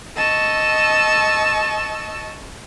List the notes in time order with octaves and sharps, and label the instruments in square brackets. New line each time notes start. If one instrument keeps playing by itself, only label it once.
[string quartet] D#5 A5 C#6 E6